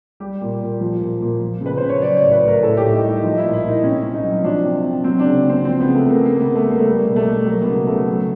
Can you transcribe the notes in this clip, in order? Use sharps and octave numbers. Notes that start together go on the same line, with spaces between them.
G3 G4
A#2
A#2
F3
A#2
A#2
F3
C#3 B4
C#3 C5
C#5
F#3 D5
C#5
A2
B4
A2
A#4
A2 A4
G4
A2
D#4
G3
D#4
F3 D#4
E4
A#2
E4
A#2
D#4
C3 C#4
C3
D#4
F#3
F3 D4
C3
C3
F#3 C4
C#3 D4
C#3 C4
F3 C4
C#3 B3
A3
C#3 A3 A#3
C#3 A#3
B3
C#3
A3
G3
A#3
A3
G3 A#3
B2 A#3
A3
B2
F#3 A#3
B3
C#3 A#3
C#3 A3
F#3